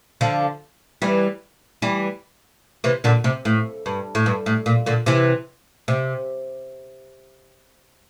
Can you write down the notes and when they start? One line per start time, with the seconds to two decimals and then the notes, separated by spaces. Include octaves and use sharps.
0.21 D3 F3
1.02 E3 G3
1.82 E3 G3
2.84 C3 E3
3.04 A#2 D3
3.24 C3
3.45 A2
3.86 G2
4.15 A2
4.26 G2
4.46 A2
4.66 A#2
4.86 A#2 D3
5.06 C3 E3
5.88 C3